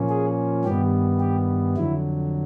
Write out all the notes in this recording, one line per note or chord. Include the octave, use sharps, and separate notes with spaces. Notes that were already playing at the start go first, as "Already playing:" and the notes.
Already playing: A#2 F3 A#3 C#4
G#4
G2 D#3 G3 B3 G4
G4
F2 D3 F#3 E4